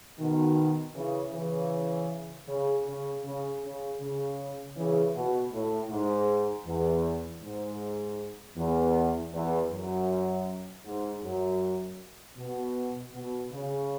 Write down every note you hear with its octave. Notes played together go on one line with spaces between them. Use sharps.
B2 D#3
C#3 E3
C#3 E3
C#3
C#3
C#3
C#3
C#3
C#3 E3
B2
A2
G#2
E2
G#2
E2
E2
F#2
G#2
F#2
B2
B2
C#3